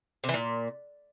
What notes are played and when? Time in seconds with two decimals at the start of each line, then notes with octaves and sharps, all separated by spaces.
0.24 C3
0.29 E3
0.34 A#2